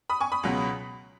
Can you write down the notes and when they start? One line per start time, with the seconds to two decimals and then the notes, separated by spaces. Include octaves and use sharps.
0.10 B5 D#6
0.21 G#5 C#6
0.32 B5 D#6
0.43 C#2 B2 F#3